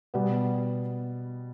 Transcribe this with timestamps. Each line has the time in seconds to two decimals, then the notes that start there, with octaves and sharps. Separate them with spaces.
0.14 B2 G3 B3